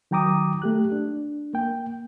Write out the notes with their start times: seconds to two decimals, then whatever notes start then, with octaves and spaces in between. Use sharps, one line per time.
0.11 D#3 F#3 G5 A#5 D6 D#6
0.62 A3 G4 F#6
0.92 D4
1.54 A#3 G5